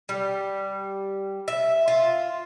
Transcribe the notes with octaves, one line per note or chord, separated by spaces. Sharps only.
G3
E5
F4